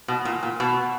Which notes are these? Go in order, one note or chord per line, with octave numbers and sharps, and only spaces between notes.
B2
A#2
A#2
B2